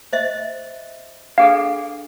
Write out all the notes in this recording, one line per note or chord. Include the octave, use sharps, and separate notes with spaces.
C5 D#5 E5
D4 G#4 A4 F5